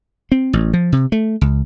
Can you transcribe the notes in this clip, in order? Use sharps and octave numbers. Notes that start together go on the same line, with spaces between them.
C4
A1
F3
C3
A3
C#2